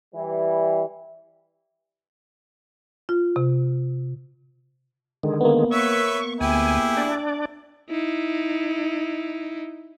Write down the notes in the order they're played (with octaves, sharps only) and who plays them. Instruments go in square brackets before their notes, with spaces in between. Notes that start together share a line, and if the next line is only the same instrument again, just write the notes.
[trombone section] E3 G3
[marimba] F4
C3
[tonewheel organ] D3 D#3 G#3
[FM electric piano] A#3 B3
[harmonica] B4 C#5 E5 [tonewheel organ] C#6
[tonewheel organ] D2 G#5 [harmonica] E4 G4 G#4
[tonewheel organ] D4 D5
[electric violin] D#4 E4